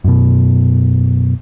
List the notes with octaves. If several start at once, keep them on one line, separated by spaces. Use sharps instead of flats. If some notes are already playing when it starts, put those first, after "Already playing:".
F#2 B2